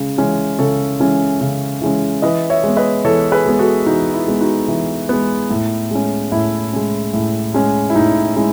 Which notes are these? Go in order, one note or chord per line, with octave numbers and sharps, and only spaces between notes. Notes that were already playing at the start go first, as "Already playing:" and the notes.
Already playing: C#3 G#3
E3 G#3 C#4
C#3 A4 C#5
E3 G#3 C#4
C#3
E3 G#3 C#4
E3 B4 D#5
C#5 E5
G#3 B3
B4 D#5
E3 A4 C#5
G#4 B4
G#3 B3
F#4 A4
E3 D#4 F#4
E4
G#3 B3
D#4 F#4
E3
G#3 B3
A2
G#3 C#4
A2 E4
G#3 C#4
A2
G#3 C#4
E4
A2 D#4
G#3 C#4 E4